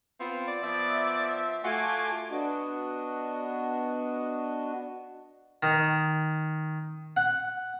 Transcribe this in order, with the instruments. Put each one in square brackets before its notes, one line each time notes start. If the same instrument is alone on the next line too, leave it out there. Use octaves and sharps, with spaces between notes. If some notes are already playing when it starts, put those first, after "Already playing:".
[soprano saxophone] B3 [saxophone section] C4 F4
[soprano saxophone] D5
[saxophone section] F3 E5 [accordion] B3
[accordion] A3 G#5 D6 [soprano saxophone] F4 [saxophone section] F#4
[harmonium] B3 D4 F#4 D#5
[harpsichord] D#3
F#5